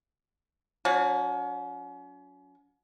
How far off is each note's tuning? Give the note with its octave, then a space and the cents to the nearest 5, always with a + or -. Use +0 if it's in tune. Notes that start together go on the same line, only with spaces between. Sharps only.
F#3 -35 C#4 +35